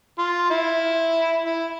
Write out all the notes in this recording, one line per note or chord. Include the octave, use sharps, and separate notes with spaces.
F4
E4
E4